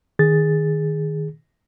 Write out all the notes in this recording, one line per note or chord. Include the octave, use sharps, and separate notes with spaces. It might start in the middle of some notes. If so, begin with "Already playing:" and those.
D#3 G#4 A6